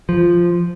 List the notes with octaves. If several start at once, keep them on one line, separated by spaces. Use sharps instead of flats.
F3